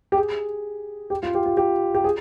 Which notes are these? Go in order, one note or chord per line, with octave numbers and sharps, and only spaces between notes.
G4
G#4
G4
F4
G4
F4
G4
G4
G#4